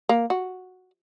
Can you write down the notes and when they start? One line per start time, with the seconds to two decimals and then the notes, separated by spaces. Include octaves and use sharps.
0.09 A#3
0.30 F#4